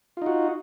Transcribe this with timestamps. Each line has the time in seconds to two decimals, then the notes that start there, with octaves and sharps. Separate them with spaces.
0.17 F4
0.22 D#4
0.26 F#4